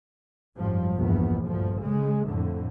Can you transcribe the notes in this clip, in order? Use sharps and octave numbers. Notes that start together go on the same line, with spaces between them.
G#1 F#2 F3 G3
A#1 E2 G2 B3
D2 G2 F3
C#3 G#3
F2 A2 D3